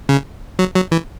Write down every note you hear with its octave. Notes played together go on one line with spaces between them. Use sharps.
C#3
F#3
F#3
E3